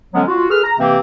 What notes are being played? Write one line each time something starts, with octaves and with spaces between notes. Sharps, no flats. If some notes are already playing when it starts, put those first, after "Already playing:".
D3 F3 F#3 G#3 B3 C#4
F4 F#4
G#4 A4 B4 F6
A#5
C3 E3 A#3 C4 G4